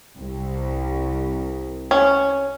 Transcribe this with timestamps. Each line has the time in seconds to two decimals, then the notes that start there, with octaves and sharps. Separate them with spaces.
0.17 C2
1.91 C#4